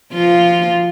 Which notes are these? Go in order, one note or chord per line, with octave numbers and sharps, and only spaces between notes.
F3 F4